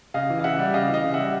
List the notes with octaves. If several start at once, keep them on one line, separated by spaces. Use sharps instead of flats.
C#3 D#5 F5
E3
F5
C#3 E5 F#5
G3
C#3 D#5 F5
E3
D#5 F5
C#3
E5 F#5
G3